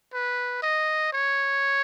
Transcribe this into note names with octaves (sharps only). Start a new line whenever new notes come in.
B4
D#5
C#5